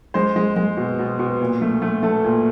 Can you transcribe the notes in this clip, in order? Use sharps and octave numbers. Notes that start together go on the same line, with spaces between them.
G#3 C5
G#3
G#3
B2
B2
B2
A#2
A3
A3
A3 A4
A#2